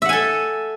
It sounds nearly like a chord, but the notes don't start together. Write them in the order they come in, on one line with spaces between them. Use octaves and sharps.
E5 F#5 G#5 A4